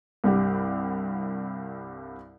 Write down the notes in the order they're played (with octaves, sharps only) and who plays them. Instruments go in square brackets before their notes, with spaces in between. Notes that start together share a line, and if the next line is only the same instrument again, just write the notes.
[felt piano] C2 G2 G4 F#5